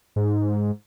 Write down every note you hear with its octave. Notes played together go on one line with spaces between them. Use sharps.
G#2